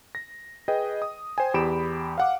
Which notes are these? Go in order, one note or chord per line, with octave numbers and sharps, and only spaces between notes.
A#6
G#4 B4 D#5 G5
D#6
C5 G5 G#5
E2 G4 B5 D7 E7
F5 F#5 D6